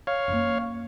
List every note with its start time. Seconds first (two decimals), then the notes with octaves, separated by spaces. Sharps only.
0.07 C#5 F5
0.28 F#2 A#3